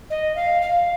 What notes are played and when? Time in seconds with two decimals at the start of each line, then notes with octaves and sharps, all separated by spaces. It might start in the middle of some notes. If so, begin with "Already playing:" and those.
0.10 D#5
0.36 F5
0.62 F5